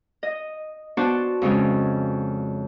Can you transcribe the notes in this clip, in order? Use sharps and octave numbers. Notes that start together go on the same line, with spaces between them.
D#5
B3 D4 F#4 C5 A5
F2 C#3 G#3 C#4